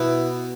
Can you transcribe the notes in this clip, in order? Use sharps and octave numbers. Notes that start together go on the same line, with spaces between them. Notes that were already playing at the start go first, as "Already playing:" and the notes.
Already playing: B2 E4